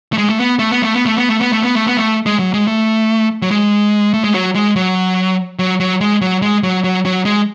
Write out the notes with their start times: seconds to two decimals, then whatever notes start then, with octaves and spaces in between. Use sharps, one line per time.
0.13 A3
0.18 G#3
0.29 A3
0.39 B3
0.59 A3
0.71 B3
0.82 A3
0.94 B3
1.06 A3
1.17 B3
1.29 A3
1.40 B3
1.52 A3
1.63 B3
1.75 A3
1.87 B3
1.98 A3
2.26 G#3
2.39 F#3
2.54 G#3
2.68 A3
3.42 F#3
3.51 G#3
4.14 A3
4.24 G#3
4.34 F#3
4.55 G#3
4.76 F#3
5.59 F#3
5.80 F#3
6.01 G#3
6.22 F#3
6.42 G#3
6.63 F#3
6.84 F#3
7.05 F#3
7.25 G#3